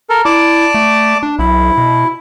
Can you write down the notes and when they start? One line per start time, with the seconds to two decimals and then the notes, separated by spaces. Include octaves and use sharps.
0.10 A4 A#4
0.25 E4 D5 A5 D6
0.74 A3
1.23 D4
1.39 B1 E4
1.77 B2